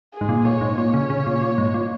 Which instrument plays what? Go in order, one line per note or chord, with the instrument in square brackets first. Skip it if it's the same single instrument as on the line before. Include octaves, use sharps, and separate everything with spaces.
[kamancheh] G#4
[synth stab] G#2
A#2
[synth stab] A#2 [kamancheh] C#5
[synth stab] G#2
[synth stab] A#2 [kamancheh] C#5
[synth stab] C#3
C#3
A#2
A#2
G#2
A#2